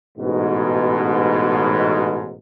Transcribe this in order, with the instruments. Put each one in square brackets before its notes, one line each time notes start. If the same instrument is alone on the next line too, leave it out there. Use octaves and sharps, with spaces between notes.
[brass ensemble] A1 G#2 B2